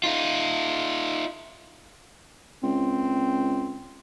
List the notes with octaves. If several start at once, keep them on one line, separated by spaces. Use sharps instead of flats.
D#4 F4
C#2 C4